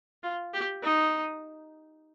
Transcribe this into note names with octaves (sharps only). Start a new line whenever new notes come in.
F4
G4
D#4